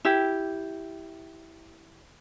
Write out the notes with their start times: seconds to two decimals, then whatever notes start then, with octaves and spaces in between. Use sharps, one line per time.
0.05 E4 G4